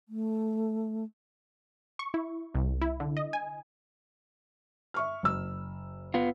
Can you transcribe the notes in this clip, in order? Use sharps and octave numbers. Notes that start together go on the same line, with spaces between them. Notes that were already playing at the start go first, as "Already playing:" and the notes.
A3
C#6
E4
C2
E4
D3
D#5
G#5
E5 C#6 F6
F#1 E6
B3 F4